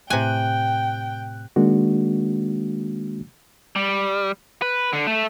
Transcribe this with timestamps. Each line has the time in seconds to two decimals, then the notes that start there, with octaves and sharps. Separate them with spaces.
0.10 A2 C3 G5 G#5 F#6
1.56 D#3 G#3 A#3 D4 F#4
3.76 G3
4.62 B4
4.93 D3
5.07 A3